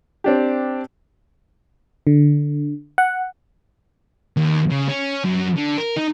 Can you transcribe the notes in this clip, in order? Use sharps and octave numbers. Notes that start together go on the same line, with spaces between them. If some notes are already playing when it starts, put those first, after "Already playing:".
C4 D4 G4
D3
F#5
D#2
C#3
C#4
F#2
D3
A#4
D#4